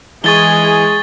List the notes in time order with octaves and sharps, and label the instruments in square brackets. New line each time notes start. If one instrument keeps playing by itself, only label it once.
[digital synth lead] E3 [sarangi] G#3 [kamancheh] G#4 [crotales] C#6 A6 G7